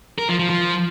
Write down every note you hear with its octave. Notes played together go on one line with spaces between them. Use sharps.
A#4
F3
F3
F3